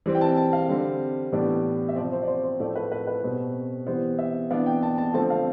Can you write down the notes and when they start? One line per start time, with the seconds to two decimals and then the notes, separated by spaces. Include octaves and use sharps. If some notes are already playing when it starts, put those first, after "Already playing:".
0.06 E3 G3 C4
0.15 G5
0.21 A5
0.37 A5
0.53 F5
0.69 D3 G3 C4
1.32 A2 E3 G3 B3 D4
1.89 E5
1.96 C3 F3 C4 D5
2.12 C5
2.23 D5
2.28 C5
2.44 C5
2.60 A2 F3 A3 D5
2.76 B4
2.92 B4
3.07 B4
3.23 B2 G3 C4
3.87 E3 G3 B3 C5
4.19 E5
4.50 E3 B3 D4 F5
4.66 G5
4.83 A5
4.98 A5
5.14 D3 F3 A3 C4 A5
5.30 F5